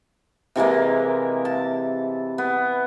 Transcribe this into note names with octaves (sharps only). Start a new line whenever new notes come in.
C3 E3 G#3 A#3
A5
B3